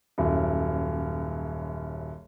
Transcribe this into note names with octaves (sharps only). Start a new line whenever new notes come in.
D#1 F#2 E4